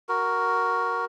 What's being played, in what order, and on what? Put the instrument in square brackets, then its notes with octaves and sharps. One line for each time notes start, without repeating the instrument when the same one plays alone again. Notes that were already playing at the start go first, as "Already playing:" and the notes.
[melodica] F#4 A#4